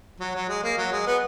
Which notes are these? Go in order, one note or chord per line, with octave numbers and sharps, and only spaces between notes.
F#3
F#3
G#3
A#3
F#3
G#3
B3